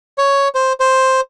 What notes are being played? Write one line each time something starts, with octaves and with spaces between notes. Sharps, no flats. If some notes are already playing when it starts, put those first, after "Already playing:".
C#5
C5
C5